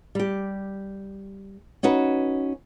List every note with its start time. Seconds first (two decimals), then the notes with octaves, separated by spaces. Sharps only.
0.15 G3 G4
1.83 C#4 D#4 F#4 B4